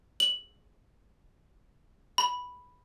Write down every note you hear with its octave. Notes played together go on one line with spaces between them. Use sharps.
F#7
B5